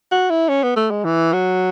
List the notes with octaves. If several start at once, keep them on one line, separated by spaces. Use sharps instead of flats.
F#4
E4
C#4
B3
A3
G#3
E3
F#3